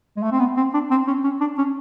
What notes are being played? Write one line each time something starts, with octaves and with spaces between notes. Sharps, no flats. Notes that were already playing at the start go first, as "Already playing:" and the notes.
G#3
A3
C4
B3
C4
D4
C4
C#4
C#4
D4
C#4